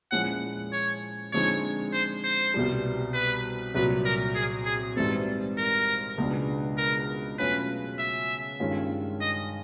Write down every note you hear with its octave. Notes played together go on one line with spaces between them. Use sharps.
A#2 F3 G#3 C#4 E4 F#5
C#5
D3 F3 G#3 C4 D#4 C#5
C5
C5
C2 B2 G3
B4
C2 A#2 F#3 B4
A#4
G#4
G#4
G#2 E3 G3 C4 A4
A#4
C#2 B2 G#3 B3 D4
A#4
B2 F#3 A3 C#4 F4 B4
E5
G2 D#3 G#3 C#4 F4
D#5